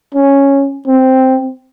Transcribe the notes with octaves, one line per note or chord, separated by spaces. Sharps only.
C#4
C4